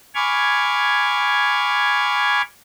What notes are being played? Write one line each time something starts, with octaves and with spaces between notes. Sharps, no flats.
G#5 B5 C#6 D6 F6 G#6